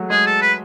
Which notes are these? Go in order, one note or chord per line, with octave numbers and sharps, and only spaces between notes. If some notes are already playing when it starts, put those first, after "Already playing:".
Already playing: F#3 G#3 A3
G#3 G#4
A4
B4